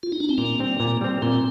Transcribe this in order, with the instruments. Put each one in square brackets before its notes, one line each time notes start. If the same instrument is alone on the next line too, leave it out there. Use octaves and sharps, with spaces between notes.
[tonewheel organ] F4
D#4
D4
C4
[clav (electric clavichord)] A#2 [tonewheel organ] A#3
[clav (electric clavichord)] G3 C4
A#2
G3 C4
[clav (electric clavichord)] A#2 [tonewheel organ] C4